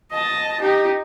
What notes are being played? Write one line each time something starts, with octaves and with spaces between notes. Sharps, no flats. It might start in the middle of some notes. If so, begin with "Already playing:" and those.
D#5 A5
D#4 G4